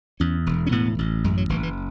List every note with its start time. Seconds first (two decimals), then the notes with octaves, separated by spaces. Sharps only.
0.20 E2 C#4
0.46 E1
0.67 C#4
0.72 A2 B3
0.99 A1
1.24 F#2 G#3
1.37 F#3
1.49 F#1 E3
1.63 E3